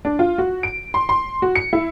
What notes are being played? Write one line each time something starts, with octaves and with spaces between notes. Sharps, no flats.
D4
F4
F#4
D7
C6
C6
F#4
C#7
E4